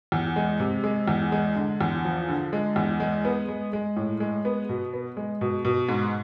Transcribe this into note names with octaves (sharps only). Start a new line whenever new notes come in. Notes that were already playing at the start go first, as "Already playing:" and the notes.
E2
G#3
C3
G#3
E2
G#3
D3
E2
F3
D3
G#3
E2
G#3
B3
G#3
G#3
A2
G#3
B3
B2
B3
G#3
B2
B2
G#2